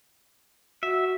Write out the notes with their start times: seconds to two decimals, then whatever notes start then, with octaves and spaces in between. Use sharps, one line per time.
0.83 F#4 E5